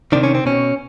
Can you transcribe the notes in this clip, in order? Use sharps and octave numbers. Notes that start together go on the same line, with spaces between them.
C3 D#3 D4
C#4
C4
B2 C#4